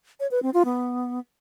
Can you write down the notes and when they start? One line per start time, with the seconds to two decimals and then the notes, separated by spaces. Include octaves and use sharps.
0.20 C#5
0.31 B4
0.42 C4
0.54 F4
0.65 B3